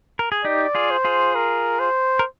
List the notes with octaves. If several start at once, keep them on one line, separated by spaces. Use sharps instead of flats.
A#4
G#4
D#4 G4 D5
F4 G#4
C5
F4 G#4
A#4
C5
A#4